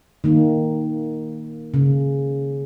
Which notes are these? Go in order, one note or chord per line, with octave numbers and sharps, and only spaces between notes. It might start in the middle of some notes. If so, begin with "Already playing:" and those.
D#3 A#3
C#3